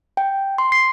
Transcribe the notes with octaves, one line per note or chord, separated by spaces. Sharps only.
G5
C6
C7